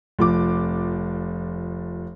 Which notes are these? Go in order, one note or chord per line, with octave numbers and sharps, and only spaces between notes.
F1 F3 D6